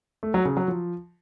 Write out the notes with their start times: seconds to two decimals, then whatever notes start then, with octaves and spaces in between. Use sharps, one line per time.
0.23 A3
0.34 F#3
0.45 C#3
0.57 F#3
0.68 F3